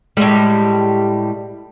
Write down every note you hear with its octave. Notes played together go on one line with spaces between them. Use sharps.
A2 G3 G#3